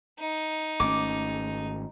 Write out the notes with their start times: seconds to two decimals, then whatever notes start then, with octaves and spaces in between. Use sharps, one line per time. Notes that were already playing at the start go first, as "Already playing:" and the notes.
0.19 D#4
0.80 G#1 A3 C#4 D6